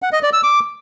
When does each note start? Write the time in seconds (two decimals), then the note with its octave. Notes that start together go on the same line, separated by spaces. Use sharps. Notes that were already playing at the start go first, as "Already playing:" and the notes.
0.02 F#5
0.13 D#5
0.23 D5
0.33 E6
0.43 D6